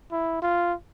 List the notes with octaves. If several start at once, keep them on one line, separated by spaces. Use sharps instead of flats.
E4
F4